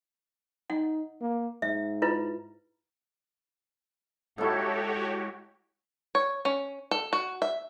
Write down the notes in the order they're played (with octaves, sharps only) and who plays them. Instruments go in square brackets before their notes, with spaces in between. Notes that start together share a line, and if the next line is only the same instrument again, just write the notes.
[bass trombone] D#4 [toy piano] F#5
[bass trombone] A#3
[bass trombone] G#2 [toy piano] E5
[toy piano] E4 F4 B4
[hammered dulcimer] G#2 E4 [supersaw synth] F#4 G4 C#5 [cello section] A4
[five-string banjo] C#5
C#4
A4
F#4
E5